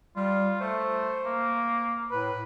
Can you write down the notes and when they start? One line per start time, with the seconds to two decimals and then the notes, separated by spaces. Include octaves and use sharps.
0.16 G3 F4
0.60 A3 C5
1.25 A#3
2.11 A2 B4